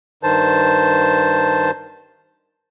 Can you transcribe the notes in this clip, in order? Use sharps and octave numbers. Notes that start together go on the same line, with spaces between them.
G2 D#3 C5 A5